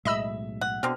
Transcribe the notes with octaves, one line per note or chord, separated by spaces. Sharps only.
B1 A2 G#3 D#5 E5 B5 E6
F#5
B2 D3 C4 F6